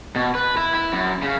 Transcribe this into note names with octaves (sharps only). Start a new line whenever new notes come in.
B2
B4
E4
E4
F#2
C#3